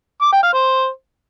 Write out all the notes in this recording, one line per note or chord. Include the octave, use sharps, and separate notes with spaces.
D6
G5
F5
C5